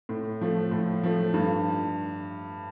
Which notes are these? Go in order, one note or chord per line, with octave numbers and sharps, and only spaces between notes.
A2
F3 A3
A2
F3 A3
G2